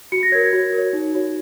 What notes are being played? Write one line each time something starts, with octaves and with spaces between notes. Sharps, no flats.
F#4 C#7
A#6
A#4 C#5 G#6
G#6
F#4
A#4
C#5
D#4
F#4 C#5